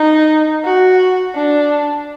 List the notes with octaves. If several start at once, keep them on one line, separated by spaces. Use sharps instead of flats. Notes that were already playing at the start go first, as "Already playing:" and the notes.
Already playing: D#4
F#4
D4